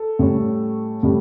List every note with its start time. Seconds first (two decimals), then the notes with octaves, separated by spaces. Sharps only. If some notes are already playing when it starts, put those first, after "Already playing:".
Already playing: A4
0.19 A2 G3 C#4
1.03 A2 G3